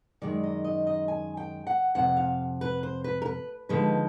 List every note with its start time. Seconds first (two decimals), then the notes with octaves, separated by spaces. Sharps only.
0.22 F#2 D#3 G#3 D5
0.43 D#5
0.64 D#5
0.87 D#5
1.08 G#5
1.37 G5
1.67 F#5
1.95 F2 C3 F#5
2.17 F5
2.61 B4
2.83 C5
3.04 B4
3.22 A#4
3.26 B4
3.69 D#2 D3 F3 G#3 B4